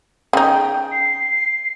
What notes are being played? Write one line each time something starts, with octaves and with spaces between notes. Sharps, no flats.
C#3 D#4 G5
C7